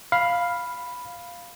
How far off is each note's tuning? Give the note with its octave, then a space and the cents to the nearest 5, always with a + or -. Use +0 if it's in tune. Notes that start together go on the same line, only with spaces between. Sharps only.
F5 +0 B5 +0